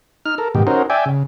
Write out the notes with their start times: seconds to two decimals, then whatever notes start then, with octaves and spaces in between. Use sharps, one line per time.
0.25 D#4 F6
0.38 A4 A#4
0.55 G#2 B2 D#3 G4
0.67 C#4 D#4 F#4 A#4 C5
0.90 D5 E5 G5 G#5
1.06 C#3